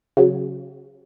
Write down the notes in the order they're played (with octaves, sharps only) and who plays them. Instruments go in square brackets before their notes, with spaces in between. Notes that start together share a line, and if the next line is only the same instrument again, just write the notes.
[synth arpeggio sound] C#3 F#3